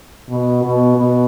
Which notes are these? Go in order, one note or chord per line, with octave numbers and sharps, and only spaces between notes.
B2
B2
B2